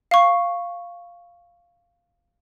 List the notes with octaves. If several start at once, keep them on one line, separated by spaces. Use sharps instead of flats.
F5 C#6